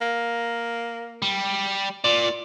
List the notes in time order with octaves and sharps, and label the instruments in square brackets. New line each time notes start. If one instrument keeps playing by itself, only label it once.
[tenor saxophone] A#3
[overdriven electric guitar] G3
[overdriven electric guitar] A#2 [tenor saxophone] D5